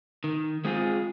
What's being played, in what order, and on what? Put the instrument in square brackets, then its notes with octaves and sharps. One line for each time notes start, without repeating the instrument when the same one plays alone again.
[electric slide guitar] D#3
G#3 C4 F4 G#4